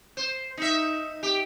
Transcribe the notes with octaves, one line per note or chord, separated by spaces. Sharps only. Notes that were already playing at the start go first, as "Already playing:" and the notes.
C5
D#4 E5
G4